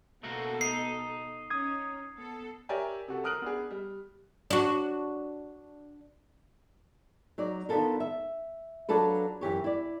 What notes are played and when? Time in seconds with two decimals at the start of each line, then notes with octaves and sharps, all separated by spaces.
0.23 B2 A3 A#3 F#4 A4
0.61 D#4 C7
1.50 C#4 D#6 G#6
2.15 B3 A4
2.69 G4 A#4 C#5 D5 E5 G#5
3.08 C3 F#4 A4
3.24 A#4 D#6 F6 F#6 D7 F#7
3.42 B3 D4 G#4
3.71 G3
4.50 D4 F#4
7.38 F#3 D#4 D5
7.69 D3 D#3 B3 F4 A4 A#4
8.00 E5
8.89 F#3 D4 F4 A4 B4
9.41 F#2 E3 G4 C#5
9.64 E4 D5